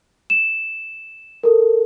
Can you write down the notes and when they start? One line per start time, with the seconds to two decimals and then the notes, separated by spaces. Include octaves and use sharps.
0.30 E7
1.43 A4 A#4